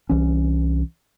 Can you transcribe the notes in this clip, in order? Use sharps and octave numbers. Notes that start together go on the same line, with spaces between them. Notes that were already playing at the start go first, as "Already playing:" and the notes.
C2 E3 C#4